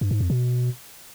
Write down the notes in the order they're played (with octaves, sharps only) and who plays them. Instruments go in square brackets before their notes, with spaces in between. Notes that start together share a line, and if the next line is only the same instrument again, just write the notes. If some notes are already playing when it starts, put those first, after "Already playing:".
[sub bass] G2
G#2
F2
B2